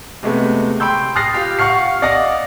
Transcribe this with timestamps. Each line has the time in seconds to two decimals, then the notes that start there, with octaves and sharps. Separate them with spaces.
0.23 C3 G#3 A3 B3
0.80 G5 B5 C6 E6 G6
1.16 D#6 F6 F#6 A6 A#6 C7
1.34 F4 G4 F5
1.59 F5 F#5 C#6 F6 C7
2.02 D5 D#5 F5 F#5 D6 A#6